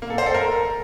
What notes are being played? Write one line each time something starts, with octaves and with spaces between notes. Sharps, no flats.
A#3
A4
C5
A4
A#4